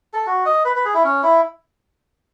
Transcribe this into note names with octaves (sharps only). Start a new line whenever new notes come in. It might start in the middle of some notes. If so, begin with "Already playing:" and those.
A4
F#4
D#5
B4
B4
G#4
E4
C#4
E4